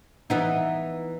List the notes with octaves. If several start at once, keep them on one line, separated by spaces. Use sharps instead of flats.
E3 B3 D#4